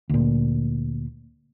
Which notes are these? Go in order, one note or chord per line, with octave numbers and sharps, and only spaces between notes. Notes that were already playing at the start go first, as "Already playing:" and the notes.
D2 A#2